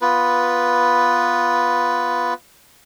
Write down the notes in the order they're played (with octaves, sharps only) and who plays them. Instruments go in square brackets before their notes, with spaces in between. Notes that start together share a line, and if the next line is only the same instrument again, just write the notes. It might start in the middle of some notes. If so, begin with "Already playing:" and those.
[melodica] B3 F4 B4